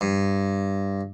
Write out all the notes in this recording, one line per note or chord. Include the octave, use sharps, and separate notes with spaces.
G2